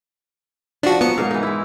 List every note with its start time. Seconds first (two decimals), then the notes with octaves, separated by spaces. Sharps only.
0.83 F3 D4 F#4
1.01 F#3 B3 C#7
1.18 G#2 A#4 F5
1.31 E3 D#4
1.43 G#3 E4